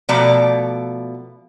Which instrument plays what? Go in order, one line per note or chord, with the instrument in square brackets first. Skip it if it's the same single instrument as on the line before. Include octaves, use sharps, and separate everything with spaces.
[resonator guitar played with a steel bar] B2 F3 A3 D5 A#5